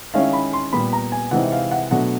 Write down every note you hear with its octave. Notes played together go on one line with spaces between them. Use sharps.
D#3 G#3 C#4 E4 F5
B5
C6
A#2 G3 B3 B5
A#5
G#5
C3 E3 G#3 C4 D#4 F#5
F5
F#5
B2 F#3 A3 D4 F#5